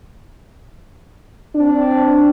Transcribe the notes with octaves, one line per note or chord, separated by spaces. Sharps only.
C4 D4